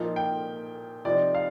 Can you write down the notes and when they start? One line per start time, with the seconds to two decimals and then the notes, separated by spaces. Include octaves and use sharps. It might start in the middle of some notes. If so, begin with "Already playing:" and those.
Already playing: A#2 F3 A#3 D#4
0.16 G5
1.05 C3 F3 C4 D#4 D5
1.35 F5